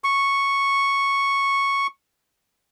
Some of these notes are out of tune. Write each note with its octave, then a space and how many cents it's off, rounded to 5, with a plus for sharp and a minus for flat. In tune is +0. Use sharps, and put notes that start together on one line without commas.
C#6 -5